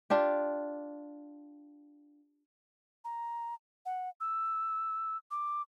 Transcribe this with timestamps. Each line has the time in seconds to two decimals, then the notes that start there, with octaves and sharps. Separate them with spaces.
0.10 D4 F4 G4
3.05 A#5
3.86 F#5
4.21 E6
5.31 D6